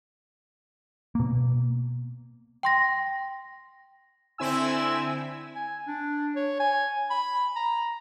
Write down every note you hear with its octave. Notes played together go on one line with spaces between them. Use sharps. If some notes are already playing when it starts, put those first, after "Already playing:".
B2 A#3
G5 C6 A#6
D3 C4 E4 G#5 E6
G#5
D4
C#5
G#5
B5
A#5